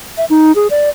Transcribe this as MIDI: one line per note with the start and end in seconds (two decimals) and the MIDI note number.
0.18 0.25 76
0.30 0.55 63
0.55 0.68 68
0.70 0.89 74